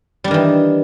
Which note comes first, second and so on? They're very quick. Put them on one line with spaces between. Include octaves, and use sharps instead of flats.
G3 D4 D#3 E3